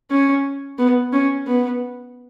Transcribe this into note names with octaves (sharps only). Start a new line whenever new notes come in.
C#4
B3
C#4
B3